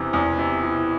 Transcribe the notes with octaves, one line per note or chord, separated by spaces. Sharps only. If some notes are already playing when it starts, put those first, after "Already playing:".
Already playing: E2 C3 E3
E2
C3
E3